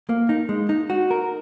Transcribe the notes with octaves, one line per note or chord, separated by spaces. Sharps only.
A#3
D#4
G#3
D#4
F#4
A#4